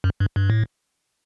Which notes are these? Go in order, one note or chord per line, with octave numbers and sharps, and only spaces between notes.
F#2
G2
G2
A2